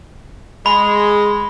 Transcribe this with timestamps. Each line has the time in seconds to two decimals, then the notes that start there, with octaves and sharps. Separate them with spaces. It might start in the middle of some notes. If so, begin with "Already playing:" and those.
0.66 G#3 B5